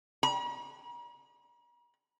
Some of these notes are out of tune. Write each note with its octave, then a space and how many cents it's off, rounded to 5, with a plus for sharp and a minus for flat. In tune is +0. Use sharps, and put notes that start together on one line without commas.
A#5 +45